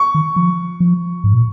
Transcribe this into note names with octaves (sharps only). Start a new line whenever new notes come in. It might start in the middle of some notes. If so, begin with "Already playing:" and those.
Already playing: C#6
D#3
F3
F3
G#2
A#2